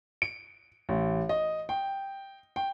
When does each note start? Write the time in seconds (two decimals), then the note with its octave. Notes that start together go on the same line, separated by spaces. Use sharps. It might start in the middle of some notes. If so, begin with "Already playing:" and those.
0.22 D7
0.89 A1
1.29 D#5
1.69 G5
2.56 G5